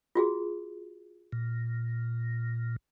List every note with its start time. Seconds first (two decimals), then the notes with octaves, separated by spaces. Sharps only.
0.15 F4 F#4 G#4
1.32 A#2